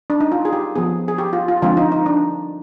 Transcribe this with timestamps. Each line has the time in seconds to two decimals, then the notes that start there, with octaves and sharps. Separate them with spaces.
0.10 D4
0.20 D#4
0.32 F4
0.45 G#4
0.53 G4
0.75 F3 B3 G#4
1.08 G#4
1.18 G4
1.33 F4
1.48 F4
1.62 D3 F3 G#3 C4 F4
1.77 D#4
1.92 D#4
2.06 D4